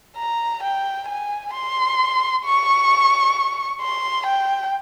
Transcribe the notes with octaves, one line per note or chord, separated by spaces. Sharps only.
A#5
G5
G#5
C6
C#6
C6
G5